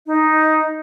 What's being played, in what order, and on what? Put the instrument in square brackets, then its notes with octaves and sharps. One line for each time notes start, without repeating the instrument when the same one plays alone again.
[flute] D#4